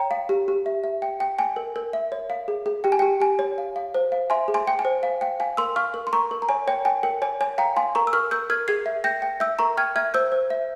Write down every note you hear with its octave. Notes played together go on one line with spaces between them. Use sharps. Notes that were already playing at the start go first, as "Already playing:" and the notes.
Already playing: C#5 G5 A#5
F5
G4
G4
E5
E5
G5
G5
G5 G#5
A#4
A#4
E5
C#5
F5
G#4
G#4
G4 G5
G#5
G4 G5
G4 G#5
C#5
F5
F5
C5
F5
E5 G#5 C6
G#4
G#5 C6
G5
G#5
C5
F5
F5 G5
F5 G#5
A#4 C6 E6
F5 C#6 F6
A#4
C6
A#4 A#5 C#6
A#4
A#5
C#5 G#5
C#5 G5
G5 G#5
A#4 G5
C#5 G#5
C#5 G#5
F5 G5 A#5
F5 G#5 C6
A#4 A#5 C#6
E6
A#4 C#6 F6
A#4 E6 G6
A#4 F6 G#6
G#4 G#6 C7
E5
G5 G6 A#6
G5
E5 E6 G6
A#4 A#5 C#6
G5 F6 G#6
E5 F6 G#6
C5 E6 G6
C5
E5